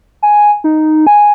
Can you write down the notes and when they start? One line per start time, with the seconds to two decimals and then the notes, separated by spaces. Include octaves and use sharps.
0.23 G#5
0.64 D#4
1.07 G#5